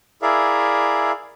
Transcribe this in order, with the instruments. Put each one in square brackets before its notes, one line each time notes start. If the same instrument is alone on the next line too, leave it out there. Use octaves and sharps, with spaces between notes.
[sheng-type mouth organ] E4 G#4 A#4 D5 E5 F5